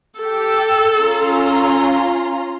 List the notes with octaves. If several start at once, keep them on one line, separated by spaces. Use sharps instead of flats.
G4 A4
C#4 F4 A#5